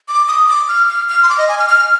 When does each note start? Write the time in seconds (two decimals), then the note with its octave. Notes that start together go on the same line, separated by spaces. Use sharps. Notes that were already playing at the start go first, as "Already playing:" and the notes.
0.08 D6
0.28 D#6
0.48 D6
0.69 F6
0.89 F6
1.09 F6
1.23 C6
1.29 D6
1.38 D#5
1.49 G#5
1.59 F6
1.69 F6